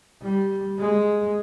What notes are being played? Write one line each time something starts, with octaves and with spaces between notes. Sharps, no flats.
G3
G#3